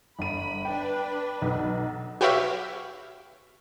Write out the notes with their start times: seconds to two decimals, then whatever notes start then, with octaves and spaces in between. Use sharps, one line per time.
0.19 G1 B5 D#7
0.65 D4 B4 G5
1.42 B1
2.21 F#4 G4 B4 C#5 E5 F5